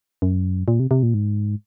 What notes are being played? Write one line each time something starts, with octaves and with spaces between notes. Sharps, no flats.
F#2
A#2
C3
C3
A#2
G#2